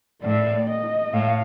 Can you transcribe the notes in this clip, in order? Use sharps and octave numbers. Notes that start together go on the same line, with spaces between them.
A2 D5
D#5
A2 F5